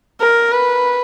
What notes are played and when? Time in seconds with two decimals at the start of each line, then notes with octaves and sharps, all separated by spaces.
0.21 A#4
0.52 B4